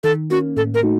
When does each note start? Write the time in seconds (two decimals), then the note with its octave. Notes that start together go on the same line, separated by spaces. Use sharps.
0.04 D#3 A4
0.30 A#3 C#4 F#4
0.57 A2 A4
0.74 A#4
0.83 A3 D#4 F#4